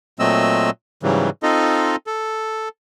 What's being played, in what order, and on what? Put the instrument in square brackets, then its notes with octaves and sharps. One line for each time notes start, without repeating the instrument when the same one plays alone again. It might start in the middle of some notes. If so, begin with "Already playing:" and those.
[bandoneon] A#2 F#3 A3 C4 D#5 E6
G#2 C#3 E3 F#3 G3
C4 D#4 F4 A4 D#5
A4